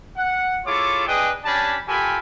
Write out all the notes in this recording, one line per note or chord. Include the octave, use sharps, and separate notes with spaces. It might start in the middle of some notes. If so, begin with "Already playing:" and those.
F#5
E4 F4 G#4 A4 C#5 D6
D4 G#4 B4 D#5 G5 D#6
C#4 D4 G4 G#5 A5 B5
F4 G4 A4 A#4 G#5 B5